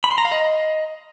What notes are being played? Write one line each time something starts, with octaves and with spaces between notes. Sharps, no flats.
B5
C6
A#5
F5
D#5